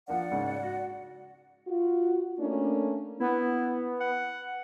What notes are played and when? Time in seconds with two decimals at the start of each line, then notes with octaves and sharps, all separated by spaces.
0.08 F3 A#3 D4 D5 F#5
0.31 G#2 C#3
0.63 F#4
1.67 F4 F#4
2.39 A3 A#3 C#4 D4
3.20 B3 E4
4.00 F#5